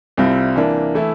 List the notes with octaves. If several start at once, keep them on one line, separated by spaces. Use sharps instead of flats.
C2 C3 G3 C4 F4
E3 A#3 D4
E3 A3 E4